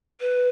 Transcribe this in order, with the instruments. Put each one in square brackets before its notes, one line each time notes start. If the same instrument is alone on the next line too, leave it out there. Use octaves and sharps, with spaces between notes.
[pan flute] B4